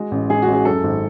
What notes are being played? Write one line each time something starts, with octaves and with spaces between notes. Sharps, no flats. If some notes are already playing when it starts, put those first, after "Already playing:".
Already playing: G#3 F#4
A1
G#3 G#4
F#4
A1
G#4
F#2 A4
G#1